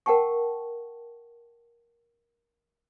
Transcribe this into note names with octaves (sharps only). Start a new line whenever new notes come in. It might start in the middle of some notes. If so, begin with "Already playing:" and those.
A#4 F#5 G5 A5 C#6